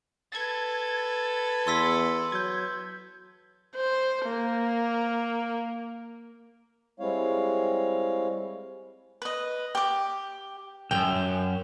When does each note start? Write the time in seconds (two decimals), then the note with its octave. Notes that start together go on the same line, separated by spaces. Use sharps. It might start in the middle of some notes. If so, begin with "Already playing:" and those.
0.32 A4 B4 G#6 A6
1.67 E2 C6 E6 B6
2.32 F#3 G6 G#6
3.75 C5
4.26 A#3
7.00 G3 G#3 C4 E4 C#5 F5
9.22 B4 D#5
9.75 G4 D6
10.91 C2 F#2 G5